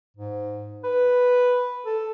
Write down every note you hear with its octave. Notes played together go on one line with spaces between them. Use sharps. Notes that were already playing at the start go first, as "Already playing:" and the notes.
G#2
B4
A4